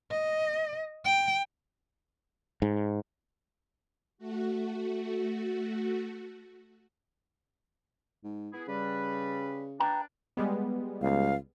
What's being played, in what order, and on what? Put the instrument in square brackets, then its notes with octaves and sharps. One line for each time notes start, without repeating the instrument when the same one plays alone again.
[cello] D#5
G5
[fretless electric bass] G#2
[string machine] A3 F#4
[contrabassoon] G#2
[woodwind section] B3 E4 G#4
[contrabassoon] C#3 [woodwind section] G3 B4
[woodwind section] D4 [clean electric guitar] B4 G5 A#5
[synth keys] G3 G#3 B3
[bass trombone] C#2 [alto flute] F5